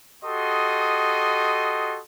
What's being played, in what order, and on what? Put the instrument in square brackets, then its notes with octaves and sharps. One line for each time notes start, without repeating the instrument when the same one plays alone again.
[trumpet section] F#4 G4 A4 D#5 C6 D#6